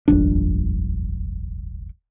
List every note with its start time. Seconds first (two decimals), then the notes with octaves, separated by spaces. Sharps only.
0.08 D#1 G#1 F2 D4